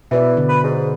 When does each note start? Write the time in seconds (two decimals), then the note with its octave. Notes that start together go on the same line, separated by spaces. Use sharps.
0.11 B2 E3 B4 D5
0.37 D3
0.49 B4
0.64 G#2